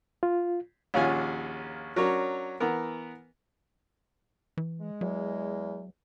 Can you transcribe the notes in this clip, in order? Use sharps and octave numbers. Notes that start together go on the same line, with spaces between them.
F4
A#1 D#2 C#4 F4 F#5 G#5
F#3 C#4 D4 A#4 C#5
E3 B3 A#4
E3
G#3
E2 F#3